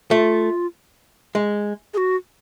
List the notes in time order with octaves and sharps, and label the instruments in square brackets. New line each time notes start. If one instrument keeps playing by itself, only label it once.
[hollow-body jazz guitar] A3 [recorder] F4
[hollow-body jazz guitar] G#3
[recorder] G#4
F#4